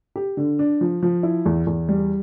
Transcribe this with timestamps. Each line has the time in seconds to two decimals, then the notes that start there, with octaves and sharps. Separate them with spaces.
0.16 G4
0.37 D3
0.59 D4
0.81 F3
1.02 F3
1.23 E4
1.46 E2
1.67 E2
1.88 G3